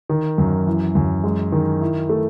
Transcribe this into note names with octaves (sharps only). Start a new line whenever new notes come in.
D#3
F#2
E3
F#2
G#3
D#3
E4
A3